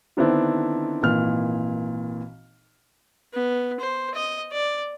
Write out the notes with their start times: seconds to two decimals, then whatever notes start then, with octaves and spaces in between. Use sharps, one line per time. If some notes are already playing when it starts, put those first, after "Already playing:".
0.17 D3 D#3 B3 C4 D4 E4
1.03 G#1 A#2 E3 F6
3.33 B3
3.80 C5
4.15 D#5
4.52 D5